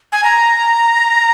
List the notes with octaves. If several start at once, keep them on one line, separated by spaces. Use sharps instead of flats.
G#5
A#5